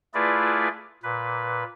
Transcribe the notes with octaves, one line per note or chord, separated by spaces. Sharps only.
A3 E4 F4 G#4 B4 D5
A#2 B4